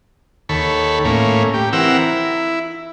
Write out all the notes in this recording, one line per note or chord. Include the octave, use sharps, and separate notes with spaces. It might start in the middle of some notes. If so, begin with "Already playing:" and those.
D#2 A4 C#5 B5
A2 A#3 C#4
G4
E3 C4 A#4 F#5 E6
E4